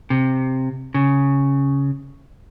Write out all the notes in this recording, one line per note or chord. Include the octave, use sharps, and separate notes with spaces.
C3
C#3